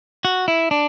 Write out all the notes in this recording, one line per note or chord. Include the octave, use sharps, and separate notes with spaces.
F#4
E4
D4